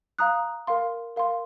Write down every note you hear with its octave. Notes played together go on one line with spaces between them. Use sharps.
F5 A#5 D#6 F#6
A#4 F5 C6
A#4 F5 C6